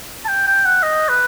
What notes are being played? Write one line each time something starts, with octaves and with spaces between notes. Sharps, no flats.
A5
G5
G5
F#5
D#5
B4